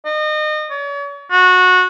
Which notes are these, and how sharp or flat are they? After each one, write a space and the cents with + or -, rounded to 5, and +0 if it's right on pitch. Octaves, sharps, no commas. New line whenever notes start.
D#5 -30
C#5 +40
F#4 -20